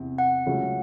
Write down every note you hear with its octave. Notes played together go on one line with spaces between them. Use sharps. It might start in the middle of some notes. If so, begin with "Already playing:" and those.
Already playing: E2 C3
F#5
C#2 C#3 F#3 A3 C#4